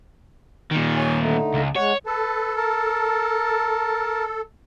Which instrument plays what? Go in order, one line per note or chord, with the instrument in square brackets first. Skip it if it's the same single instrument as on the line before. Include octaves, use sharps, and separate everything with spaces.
[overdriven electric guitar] A#2 D#3
[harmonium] C#5 G#5
D3 A3 D#4
[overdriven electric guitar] C#2
[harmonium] G#3 F#5 [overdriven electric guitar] C#5
[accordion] A4 [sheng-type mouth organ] B4 A5
[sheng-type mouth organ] A#4 A5